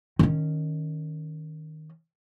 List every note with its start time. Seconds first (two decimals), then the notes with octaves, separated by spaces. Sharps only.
0.19 D#3 C#4